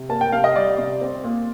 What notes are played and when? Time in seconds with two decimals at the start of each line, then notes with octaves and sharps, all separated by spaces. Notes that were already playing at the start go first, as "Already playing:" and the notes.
Already playing: C3
0.09 A#3 A5
0.21 G5
0.32 C3 F5
0.44 D#5
0.56 G3 D5
0.78 C3
1.01 C4
1.24 A#2